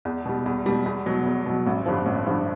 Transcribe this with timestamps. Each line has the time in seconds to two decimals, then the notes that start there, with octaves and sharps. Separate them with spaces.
0.05 E2
0.26 B2 G3
0.46 E2
0.66 B2 G3
0.86 E2
1.06 B2 F#3
1.26 E2
1.46 B2 F#3
1.67 A1
1.86 G2 D3 F3
2.06 A1
2.26 G2 D3 F3